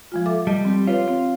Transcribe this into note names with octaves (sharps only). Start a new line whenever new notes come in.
F3 G#3 F4
A4 E5 D6
G3 D#5 A5
C4 G4
F4 B4 C#5
C4